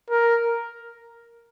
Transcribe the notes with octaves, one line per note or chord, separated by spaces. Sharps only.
A#4